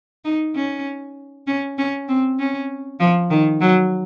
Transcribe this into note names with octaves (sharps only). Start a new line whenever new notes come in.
D#4
C#4
C#4
C#4
C4
C#4
F3
D#3
F#3